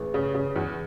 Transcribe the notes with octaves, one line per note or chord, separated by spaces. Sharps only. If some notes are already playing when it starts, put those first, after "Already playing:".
Already playing: A1 G#4 B4
C#3
C#3
E2